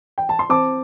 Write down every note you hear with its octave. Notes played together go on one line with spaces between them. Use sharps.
G5
A5
C6
C4 A5 D6